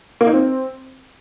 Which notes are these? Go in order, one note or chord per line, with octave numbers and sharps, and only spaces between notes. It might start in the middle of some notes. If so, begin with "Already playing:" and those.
A#3
D#4
C4